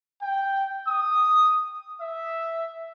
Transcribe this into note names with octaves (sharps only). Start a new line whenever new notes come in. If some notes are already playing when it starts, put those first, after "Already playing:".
G5
D#6
E5